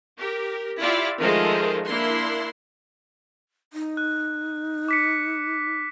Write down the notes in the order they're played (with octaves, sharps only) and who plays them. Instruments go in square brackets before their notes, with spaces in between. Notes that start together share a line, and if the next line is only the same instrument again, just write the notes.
[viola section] G4 A#4
E4 F4 G4 D5 E5
D#3 F3 G#3 A3 A#4 C5
A#3 D4 E4 C6
[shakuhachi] D#4
[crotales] F#6
D6 B6 C#7